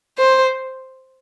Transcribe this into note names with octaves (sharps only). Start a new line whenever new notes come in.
C5